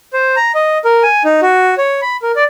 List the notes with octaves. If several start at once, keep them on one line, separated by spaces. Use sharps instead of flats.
C5
A#5
D#5
A#4
G#5
D#4
F#4
C#5
B5
A#4
D5